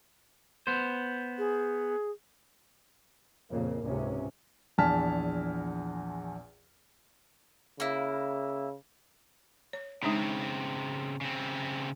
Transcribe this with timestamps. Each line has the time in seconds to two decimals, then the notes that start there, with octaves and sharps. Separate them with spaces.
0.67 B3 C5
1.38 G#4
3.50 F2 A#2 C#3 A#3
3.83 C#2 G#2 C3 C#4
4.78 A#1 E2 G#5 A5 F6 B6
7.80 C#3 A#3 E4
9.73 C#5
10.03 C#3 G#3 C4 D4 D#4
11.21 C#3 C4